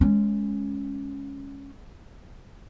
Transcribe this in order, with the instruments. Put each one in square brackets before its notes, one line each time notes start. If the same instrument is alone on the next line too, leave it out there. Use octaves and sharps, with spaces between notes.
[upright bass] G#3 C#4